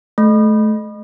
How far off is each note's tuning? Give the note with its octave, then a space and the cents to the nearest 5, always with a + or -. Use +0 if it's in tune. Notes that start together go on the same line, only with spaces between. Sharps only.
A3 -30